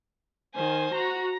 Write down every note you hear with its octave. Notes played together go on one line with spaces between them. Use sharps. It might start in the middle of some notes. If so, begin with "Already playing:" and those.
D#3 C5 G#5
F#4 A#5